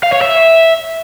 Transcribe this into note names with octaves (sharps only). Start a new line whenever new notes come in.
F5
C#5
E5